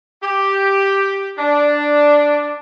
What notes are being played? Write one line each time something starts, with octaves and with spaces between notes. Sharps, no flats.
G4
D4